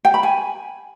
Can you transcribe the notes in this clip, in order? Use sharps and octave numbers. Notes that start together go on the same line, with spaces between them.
G5
B5
G#5